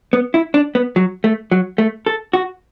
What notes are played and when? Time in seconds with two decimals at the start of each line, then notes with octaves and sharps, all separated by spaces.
0.13 B3
0.34 E4
0.54 D4
0.75 B3
0.96 F#3
1.24 A3
1.51 F#3
1.78 A3
2.06 A4
2.33 F#4